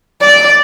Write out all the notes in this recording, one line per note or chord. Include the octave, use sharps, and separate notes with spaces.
D5